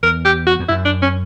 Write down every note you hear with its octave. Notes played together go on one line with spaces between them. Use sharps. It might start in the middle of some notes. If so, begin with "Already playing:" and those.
E2 A#4
G4
F#4
E2
F#2 E4
D4
C#4